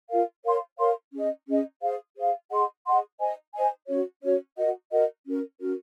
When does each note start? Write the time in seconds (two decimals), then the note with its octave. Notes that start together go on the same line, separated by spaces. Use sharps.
0.10 F4 A#4 F5
0.44 A#4 C#5 F5 C6
0.79 A#4 C#5 F5 C6
1.13 C#4 G#4 D#5
1.48 C#4 G#4 D#5
1.82 G#4 C5 F5
2.16 G#4 C5 F5
2.50 G#4 D#5 F#5 C6
2.86 G#4 D#5 F#5 C6
3.20 C5 D#5 G#5
3.54 C5 D#5 G#5
3.88 C#4 F#4 C#5
4.23 C#4 F#4 C#5
4.57 F#4 A#4 D#5 F#5
4.91 F#4 A#4 D#5 F#5
5.26 C#4 F#4 A#4
5.60 C#4 F#4 A#4